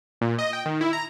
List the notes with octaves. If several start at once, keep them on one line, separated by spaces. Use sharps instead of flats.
A#2
D#5
G5
D#3
E4
A#5